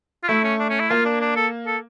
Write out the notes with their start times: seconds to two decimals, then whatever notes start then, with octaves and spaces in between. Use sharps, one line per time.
0.24 F4
0.29 A3 E4
0.44 C#4
0.60 D4
0.70 C#4
0.80 E4
0.90 A#3 F4
1.06 D4
1.21 D4
1.36 A4
1.67 A4